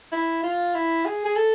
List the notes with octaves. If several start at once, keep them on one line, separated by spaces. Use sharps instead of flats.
E4
F4
E4
G#4
G#4
A4